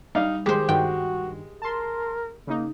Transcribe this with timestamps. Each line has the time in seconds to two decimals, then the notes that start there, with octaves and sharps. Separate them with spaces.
0.15 G3 D#4 F5
0.46 D#3 G#3 G4 C5
0.69 G2 D#3 F#4 G5
1.62 A#4 A5 C6
2.47 C#3 A#3 D#4